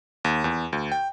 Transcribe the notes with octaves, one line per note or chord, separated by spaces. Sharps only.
D#2
E2
D2
G5